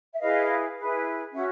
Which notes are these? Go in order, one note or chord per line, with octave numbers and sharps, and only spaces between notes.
E5
E4 G#4 B4 D#5 F5
E4 G#4 B4
C#4 F#4 E5 F#5